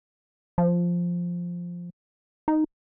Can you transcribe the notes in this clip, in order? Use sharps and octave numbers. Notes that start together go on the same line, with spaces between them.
F3
D#4